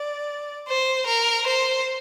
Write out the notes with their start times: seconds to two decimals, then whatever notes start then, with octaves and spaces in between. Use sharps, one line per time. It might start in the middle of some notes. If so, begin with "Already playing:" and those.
Already playing: D5
0.68 C5
1.07 A#4
1.46 C5